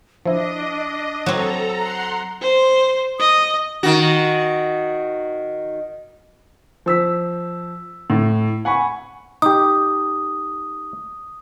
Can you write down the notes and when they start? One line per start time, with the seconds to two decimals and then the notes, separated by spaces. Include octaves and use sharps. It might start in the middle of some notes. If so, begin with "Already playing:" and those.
0.26 F3 D4 E4 D#5
1.26 F#3 C4 A4 A#5
1.76 F#5 A#5 C6
2.41 C5
3.20 D#5 D#6
3.83 D#3 F#4
6.86 F3 E6 B6
8.10 A2
8.65 F#5 G#5 B5 C#6
9.42 D#4 G4 D#6